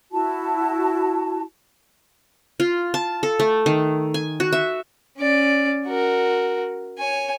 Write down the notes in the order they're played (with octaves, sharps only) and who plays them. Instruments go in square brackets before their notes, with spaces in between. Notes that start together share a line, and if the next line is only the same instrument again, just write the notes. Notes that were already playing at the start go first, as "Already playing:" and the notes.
[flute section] E4 F#4 A5
[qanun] F4
A5
A4
A3
D#3
G#5
F#4
E5
[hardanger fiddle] C#4 D5
F#4 A#4
C#5 G#5